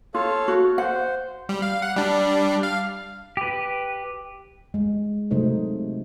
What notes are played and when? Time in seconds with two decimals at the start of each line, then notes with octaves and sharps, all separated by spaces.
0.14 F4 A4 C#5 F5
0.48 F#4
0.78 C5 F#5
1.49 G3
1.62 F5
1.82 F#5
1.96 G3 D4
2.63 F5
3.37 G4 B4
4.74 G#3
5.31 C3 F#3 A3 D#4 C5 D#5